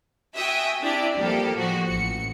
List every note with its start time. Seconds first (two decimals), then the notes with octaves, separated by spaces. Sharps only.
0.36 F#4 E5 G5 G#5 D#6
0.80 C4 D4 E4 G4 D5
1.17 F3 G3 A#3 G4 A4
1.57 A2 F3 F#4
1.86 A1 C#7